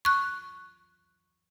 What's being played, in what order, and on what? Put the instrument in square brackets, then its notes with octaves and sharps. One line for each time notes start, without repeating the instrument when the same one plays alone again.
[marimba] C#6 F#6